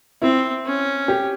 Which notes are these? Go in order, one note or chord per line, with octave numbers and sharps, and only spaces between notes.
C4 E4
C#4
G4